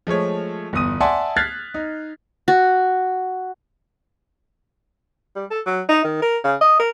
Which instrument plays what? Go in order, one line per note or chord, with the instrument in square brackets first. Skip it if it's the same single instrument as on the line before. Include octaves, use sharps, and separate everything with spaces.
[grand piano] F3 G#3 A3 C#5
G1 E2 D#6 D#7
D5 E5 F#5 G#5 A5 C6
F6 F#6 G#6 A6 B6 C7
D#4
[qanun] F#4
[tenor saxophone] G3
A4
F#3
D#4
D#3
A#4
C#3
D#5
A#4